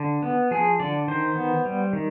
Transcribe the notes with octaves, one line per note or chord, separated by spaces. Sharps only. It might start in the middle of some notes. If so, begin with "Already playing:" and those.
Already playing: D3
B3
F3 G#4
D3 D5
D#3 C5
B3
G3
D#3